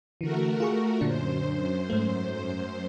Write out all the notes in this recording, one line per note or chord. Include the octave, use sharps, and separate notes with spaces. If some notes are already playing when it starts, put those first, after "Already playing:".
D3 E3 A3 F#4 A#4
F4 G#4 C#6
F#2 A#2 D3 D4 C5
G#2 A3